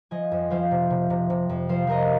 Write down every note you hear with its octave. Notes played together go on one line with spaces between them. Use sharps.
F3 D#5 G#5
F2
F3 C5 F5
C3
C3
C3
C3
F2
F3 C5 F5
F3 A#4 D#5